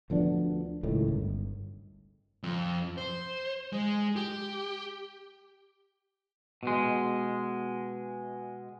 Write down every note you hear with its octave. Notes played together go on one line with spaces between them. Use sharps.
D2 F3 B3 D4
C#2 A2 D#3
G1
F2
C5
G#3
G4
B2 G#3